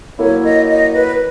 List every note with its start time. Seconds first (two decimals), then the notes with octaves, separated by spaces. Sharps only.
0.19 F#3 A#3 E4 C#5
0.44 D#5
0.69 D#5
0.94 B4